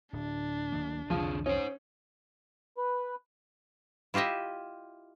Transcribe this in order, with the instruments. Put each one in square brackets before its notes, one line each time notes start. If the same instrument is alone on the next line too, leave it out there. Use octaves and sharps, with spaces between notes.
[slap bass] D1 [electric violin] D4
[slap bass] D1 D#3 A#3
[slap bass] C2 F2 E3 [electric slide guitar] D3 G#4 [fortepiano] F3
[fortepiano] C#4 [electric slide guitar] D#4 C5
[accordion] B4
[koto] E4 F4 G4 D#5 E5